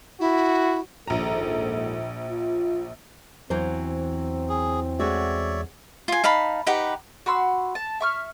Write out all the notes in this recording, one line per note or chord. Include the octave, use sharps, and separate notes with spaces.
E4 F#4
A#1 D#2 G#2 A4 A#5
F4
E2 E3 F#3 C4 C5
G#4
G#3 A3 F#4 C#5 D5 E5
F4 G#5
D#4 F5 A5 B5
D#4 G4 B4 F#5
F#4 B5 C6 E6
A5
E5 C#6 F6